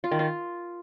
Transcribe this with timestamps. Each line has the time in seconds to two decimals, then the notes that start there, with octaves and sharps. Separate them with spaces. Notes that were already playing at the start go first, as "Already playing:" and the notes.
0.04 F4
0.11 D#3
0.19 F4